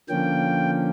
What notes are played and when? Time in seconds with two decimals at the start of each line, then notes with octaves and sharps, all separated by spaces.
0.09 D3 F3 A#3 C#4 G5